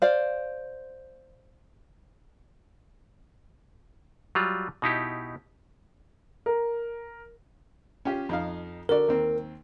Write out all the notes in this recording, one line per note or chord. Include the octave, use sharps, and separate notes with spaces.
C5 D5 F5
F#3 G3 F4
B2 D#4 E4 G4
A#4
C#4 F4 G4
F2 D#4 F5
D3 F#4 A#4 D5
D#2 C4